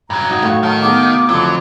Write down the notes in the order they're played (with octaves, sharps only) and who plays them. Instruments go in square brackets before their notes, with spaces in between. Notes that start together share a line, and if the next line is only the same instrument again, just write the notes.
[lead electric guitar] G2 F#3 [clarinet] A#5
[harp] D#4 F#4
[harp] A2 C#6 [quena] F5
[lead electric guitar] D#3 [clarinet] F#3 [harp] F5 [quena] A5
[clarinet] B3 [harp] D#4 G#4 [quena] D6
[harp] F2 D3 [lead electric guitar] F#3 [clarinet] E4